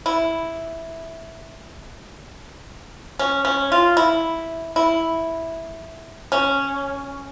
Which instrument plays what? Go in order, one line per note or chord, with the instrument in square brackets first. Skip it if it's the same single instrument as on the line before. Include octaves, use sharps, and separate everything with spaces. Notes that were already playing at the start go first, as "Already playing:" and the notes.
[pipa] E4
C#4
C#4
F4
E4
E4
C#4